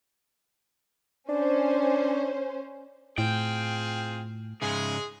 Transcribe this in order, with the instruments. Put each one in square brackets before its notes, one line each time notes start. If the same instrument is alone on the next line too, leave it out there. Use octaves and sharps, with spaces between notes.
[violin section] C#4 C5 [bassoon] D4
[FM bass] A2 [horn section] C4 F4 G#4 [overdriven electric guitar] G5
[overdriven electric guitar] G#2 C#3 [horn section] G#3 G#4